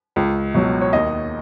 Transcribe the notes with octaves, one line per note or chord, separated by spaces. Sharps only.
C#2
B2 F#3
C#5
D#2 D#5